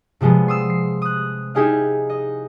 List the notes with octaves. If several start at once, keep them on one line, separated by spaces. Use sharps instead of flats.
C3 F3 G3 G#3 B3
C6 D#6 E6
C7
D#6 F#6
D#4 E4 G4 G#4 D#5 F5
D#5